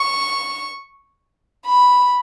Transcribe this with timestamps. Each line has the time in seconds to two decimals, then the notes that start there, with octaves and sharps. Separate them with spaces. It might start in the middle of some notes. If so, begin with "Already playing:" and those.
Already playing: C#6
1.66 B5